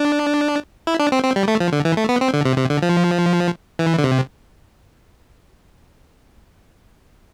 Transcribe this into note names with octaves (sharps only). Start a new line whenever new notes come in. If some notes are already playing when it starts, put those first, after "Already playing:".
Already playing: D4
E4
D4
C4
C4
G3
A3
F3
D3
E3
A3
B3
C4
D3
C3
C3
D3
F3
E3
D3
C3